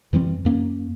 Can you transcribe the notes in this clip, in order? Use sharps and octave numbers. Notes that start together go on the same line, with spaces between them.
F#2 E3 G3 C4
F#2 A#3 C#4